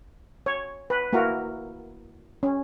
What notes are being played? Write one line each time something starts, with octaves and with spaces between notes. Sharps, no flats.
C#5
B4
A#3 E4 F#4 A#4
C#4